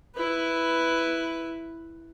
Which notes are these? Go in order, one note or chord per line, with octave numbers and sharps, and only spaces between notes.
E4 B4